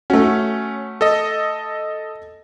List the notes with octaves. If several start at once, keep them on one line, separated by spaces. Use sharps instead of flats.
A3 C#4 F#4
A4 D#5